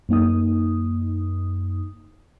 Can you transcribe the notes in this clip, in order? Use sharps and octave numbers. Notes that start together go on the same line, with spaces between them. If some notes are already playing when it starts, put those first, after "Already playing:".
F#2 A#3 D#4 D#6